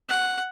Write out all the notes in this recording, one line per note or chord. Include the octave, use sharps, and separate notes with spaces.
F#5